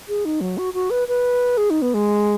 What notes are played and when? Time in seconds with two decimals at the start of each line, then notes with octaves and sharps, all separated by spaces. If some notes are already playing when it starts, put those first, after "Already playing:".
0.09 G#4
0.25 D#4
0.41 F#3
0.58 F#4
0.74 F#4
0.90 B4
1.08 B4
1.57 G#4
1.70 D#4
1.82 B3
1.94 G#3